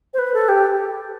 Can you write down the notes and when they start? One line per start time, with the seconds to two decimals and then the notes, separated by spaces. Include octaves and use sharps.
0.14 C5
0.19 B4
0.34 A4
0.49 G4